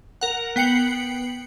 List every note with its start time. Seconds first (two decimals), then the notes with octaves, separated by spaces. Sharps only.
0.21 A#4 F#5
0.56 B3 G5 C7 C#7 F#7